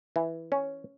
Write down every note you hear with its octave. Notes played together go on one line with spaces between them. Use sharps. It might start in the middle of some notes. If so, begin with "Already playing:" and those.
E3
C#4